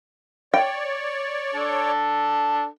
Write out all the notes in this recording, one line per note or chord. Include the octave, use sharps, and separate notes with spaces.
C#5 D5 G5
D4 A4